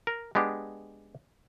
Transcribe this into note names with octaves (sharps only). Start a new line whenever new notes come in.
A#4
G#3 B3 D4 G4